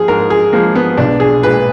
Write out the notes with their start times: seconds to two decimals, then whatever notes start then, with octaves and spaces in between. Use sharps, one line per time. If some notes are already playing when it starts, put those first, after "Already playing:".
Already playing: F3 G#4
0.08 G#2 A#4
0.30 G#4
0.53 F3 G#3 A#3
0.75 B3
0.98 B1 D4
1.20 G#4
1.43 A#2 G#3 B4